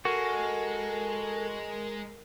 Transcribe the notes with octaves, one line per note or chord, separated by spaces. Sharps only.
G#3 F#4 A4 A#4